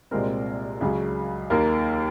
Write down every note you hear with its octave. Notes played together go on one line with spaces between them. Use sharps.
C2 A#2 G#3 C4 A#4
C#2 C#3 F#3 G#4
D#2 D#3 A#3 A#4